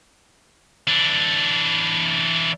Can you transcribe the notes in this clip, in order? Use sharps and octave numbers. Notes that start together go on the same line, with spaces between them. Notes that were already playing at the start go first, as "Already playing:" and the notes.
E3 D4